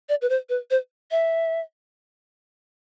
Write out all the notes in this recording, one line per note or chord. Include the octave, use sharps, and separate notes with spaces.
D5
B4
C5
B4
C5
E5